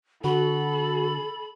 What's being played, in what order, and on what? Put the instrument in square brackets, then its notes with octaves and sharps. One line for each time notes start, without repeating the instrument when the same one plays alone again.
[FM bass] D3 [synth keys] F#4 [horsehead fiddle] A4 [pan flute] B5